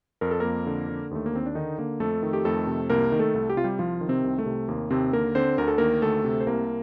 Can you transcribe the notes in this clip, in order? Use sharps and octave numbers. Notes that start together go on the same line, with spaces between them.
F2 A#4
A4
F2 A#3 A#4
D3
D3
D#2 A3
A#3
D#2 C4
D4
D3 D#3 D#4
D3 A#3
F2 A3 A4
D#3
G4
F2 A3 A4
C3
C2 A#3 A#4
D#3
A3 A4
C2
G4
C3 F4
G3 G4
C2 F3 F4
D#3
C3 C4
C2
A3
C3
D#2 A#3
D#2 C3 C4
D3 A#3 A#4
D3 C4 C5
D2 A#4
A4
D#3 A#3 A#4
D2 A3 A4
C3
C5
C2 A#3 A#4